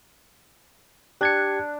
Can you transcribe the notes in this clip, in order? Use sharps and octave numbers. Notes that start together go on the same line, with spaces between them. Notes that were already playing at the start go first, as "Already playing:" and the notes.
D4 G4 G#6 C#7